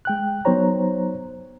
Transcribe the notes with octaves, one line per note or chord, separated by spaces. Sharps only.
G#3 G5 F#6
F#3 B3 D#4 C5 C#5 A#5